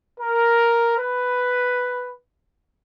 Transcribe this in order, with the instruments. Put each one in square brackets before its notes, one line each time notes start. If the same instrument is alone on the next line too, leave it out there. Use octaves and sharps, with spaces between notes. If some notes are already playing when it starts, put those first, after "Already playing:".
[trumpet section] A#4
B4